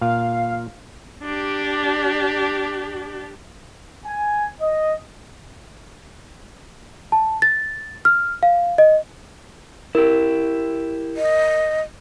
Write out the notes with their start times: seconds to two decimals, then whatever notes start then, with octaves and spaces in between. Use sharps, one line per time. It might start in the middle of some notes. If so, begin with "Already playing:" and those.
0.01 A#2 F5
1.23 D4 G4
4.05 G#5
4.60 D#5
7.12 A5
7.42 A6
8.05 F6
8.43 F5
8.78 D#5
9.95 E4 G4 A#4
11.17 D#5